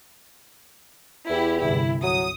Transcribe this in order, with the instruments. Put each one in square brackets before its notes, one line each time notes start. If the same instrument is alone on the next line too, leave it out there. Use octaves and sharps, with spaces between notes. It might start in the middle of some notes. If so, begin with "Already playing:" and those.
[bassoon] E2 [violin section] E4 G4
[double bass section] G1 C2 [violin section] E4
[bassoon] F#3 [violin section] D#6